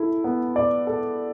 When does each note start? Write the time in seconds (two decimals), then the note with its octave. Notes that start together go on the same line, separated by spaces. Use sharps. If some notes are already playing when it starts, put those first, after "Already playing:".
Already playing: E4 A4
0.24 B3
0.56 D5
0.87 A4